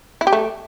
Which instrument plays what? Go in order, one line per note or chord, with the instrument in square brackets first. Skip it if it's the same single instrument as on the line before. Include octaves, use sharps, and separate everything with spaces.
[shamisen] E4
G4
A3